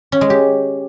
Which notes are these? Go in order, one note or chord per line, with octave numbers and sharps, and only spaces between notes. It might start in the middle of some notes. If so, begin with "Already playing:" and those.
C#4
G#3
G4